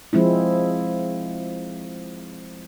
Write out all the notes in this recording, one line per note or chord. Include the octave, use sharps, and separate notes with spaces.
F3 G#3 C4 E4